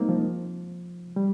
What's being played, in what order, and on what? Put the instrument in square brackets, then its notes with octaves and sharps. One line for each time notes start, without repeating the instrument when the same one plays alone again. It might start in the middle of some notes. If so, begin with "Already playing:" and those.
Already playing: [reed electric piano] G3 G#3 A#3 C4 D#4
F3
G3